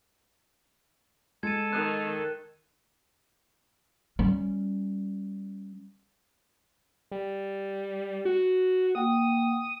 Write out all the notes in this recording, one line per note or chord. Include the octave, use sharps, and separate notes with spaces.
G#3 A4 G#6 D#7
D#3 F#6 D#7
G3 C#4
G3
F#4
A#3 F#5 G5 D#6